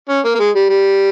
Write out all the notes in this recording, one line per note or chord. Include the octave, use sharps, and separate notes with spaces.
C#4
A#3
A#3
G#3
G3
G3